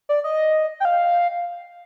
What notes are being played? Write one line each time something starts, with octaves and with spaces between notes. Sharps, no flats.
D5
D#5
G5
F5